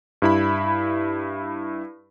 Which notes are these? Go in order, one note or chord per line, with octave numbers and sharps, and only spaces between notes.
G2 E4 B5